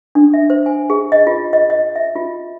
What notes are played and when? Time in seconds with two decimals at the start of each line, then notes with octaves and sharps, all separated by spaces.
0.15 D4
0.34 E5
0.50 C5
0.66 G#5
0.90 G#4
1.12 D#5
1.27 F4
1.53 D#5
1.70 D#5
1.96 E5
2.16 F4